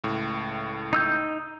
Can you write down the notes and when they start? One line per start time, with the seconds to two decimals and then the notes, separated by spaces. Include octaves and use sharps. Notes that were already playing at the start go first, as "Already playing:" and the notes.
0.04 C#2 A2
0.93 D#4 E6 G6